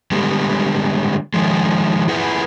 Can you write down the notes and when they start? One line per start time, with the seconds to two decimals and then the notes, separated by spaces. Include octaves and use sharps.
0.11 D3 G3 G#3 B3
1.34 D#3 F3 G#3
2.08 E4 F4 G#4 B4 F#5